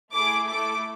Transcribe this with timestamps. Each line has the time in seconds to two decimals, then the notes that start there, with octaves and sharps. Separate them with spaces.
0.13 A3 E4 G#4 D6
0.49 A3 E4 A4 D6